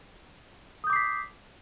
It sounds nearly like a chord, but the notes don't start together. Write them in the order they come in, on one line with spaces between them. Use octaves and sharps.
D#6 G6 D6 C7 B6